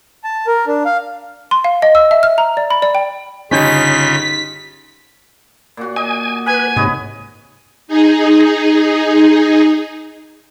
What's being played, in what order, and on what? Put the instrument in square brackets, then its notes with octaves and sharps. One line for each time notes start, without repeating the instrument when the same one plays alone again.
[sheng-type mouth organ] A5
A#4
D4
F5
[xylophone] C6
F5
D#5
E6
E5
F6
A#5
D5
B5
D5
G5
[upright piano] G1 C#4 G6 [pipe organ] C#3 F4 [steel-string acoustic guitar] D#4 G4 [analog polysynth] B6
[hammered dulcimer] A#2 F#4
[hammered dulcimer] D#5 [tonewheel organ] G#5
[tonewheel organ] B4 [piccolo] G#5
[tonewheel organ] G#2 C3 [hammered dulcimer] B4 C#5 D#5
[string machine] D#4 G#4